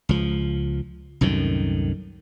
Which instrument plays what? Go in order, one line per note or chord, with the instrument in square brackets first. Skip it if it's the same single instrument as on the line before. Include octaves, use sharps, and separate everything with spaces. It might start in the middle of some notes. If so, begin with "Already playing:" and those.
[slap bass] C#2 F3
C2 F#2 A2 D#3